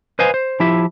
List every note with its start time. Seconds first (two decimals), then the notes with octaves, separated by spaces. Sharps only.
0.19 B4 C5 D#5 F5 G#5
0.34 C5
0.60 F3 E4 G4 E5